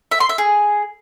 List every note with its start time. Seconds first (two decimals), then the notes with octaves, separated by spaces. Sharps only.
0.12 E5
0.20 C6
0.29 E5
0.38 G#4